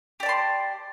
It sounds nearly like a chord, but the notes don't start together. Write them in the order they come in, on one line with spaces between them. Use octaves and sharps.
G4 D5 A5 C6